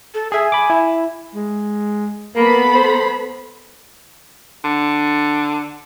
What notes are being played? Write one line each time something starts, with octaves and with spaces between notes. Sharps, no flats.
A4
G#4 E5 G#5
B5 D6
E4
G#3
A#3 B3 A4 B5
C5
D3